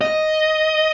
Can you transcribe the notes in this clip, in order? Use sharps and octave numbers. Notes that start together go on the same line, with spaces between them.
D#5